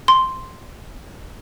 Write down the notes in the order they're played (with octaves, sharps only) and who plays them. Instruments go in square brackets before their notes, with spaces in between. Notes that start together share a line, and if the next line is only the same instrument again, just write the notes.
[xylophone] C6